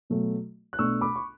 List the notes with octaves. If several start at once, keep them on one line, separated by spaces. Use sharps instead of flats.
B2 F#3 A3
F#6
B2 A3 D4 C#6 E6
B5 D6
C#6